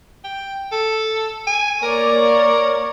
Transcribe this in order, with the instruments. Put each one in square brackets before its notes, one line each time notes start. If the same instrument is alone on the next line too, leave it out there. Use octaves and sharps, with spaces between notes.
[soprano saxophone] G5
A4
G#5
[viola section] A#3 C#5 D5 [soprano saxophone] A#4